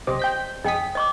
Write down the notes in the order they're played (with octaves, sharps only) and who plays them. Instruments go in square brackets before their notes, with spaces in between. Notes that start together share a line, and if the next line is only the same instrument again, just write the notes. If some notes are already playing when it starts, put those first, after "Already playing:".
[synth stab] B1 C3 D6 [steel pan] G4 C5 D#5
[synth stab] G5 G6 B6
[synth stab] F2 B6 [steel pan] G#4 D#6 [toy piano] D#5 G5
[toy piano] D#5 C#6 D6